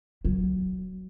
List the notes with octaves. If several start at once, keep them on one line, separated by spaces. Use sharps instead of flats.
F#3